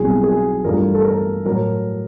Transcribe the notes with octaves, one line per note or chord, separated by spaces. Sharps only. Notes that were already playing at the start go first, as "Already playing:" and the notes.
Already playing: B1 B2 G3 C4 E4 G#4
G#4
G2 E3 A3 D4 F4 A#4
A4
A#4
A2 F#3 A#4